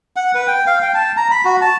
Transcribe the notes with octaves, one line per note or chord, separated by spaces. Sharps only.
F#5
B4
G5
F5
G5
A5
A#5
B5
F#4
A5